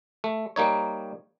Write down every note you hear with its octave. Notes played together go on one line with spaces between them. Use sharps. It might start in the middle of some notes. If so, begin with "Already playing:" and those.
A3
G3 A#3 D#4 C#5